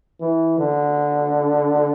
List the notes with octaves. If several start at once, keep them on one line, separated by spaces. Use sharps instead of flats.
E3
D3